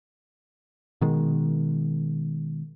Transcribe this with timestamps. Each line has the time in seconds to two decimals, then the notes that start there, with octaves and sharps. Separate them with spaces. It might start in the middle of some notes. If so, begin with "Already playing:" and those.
1.01 B2 D#3 G#3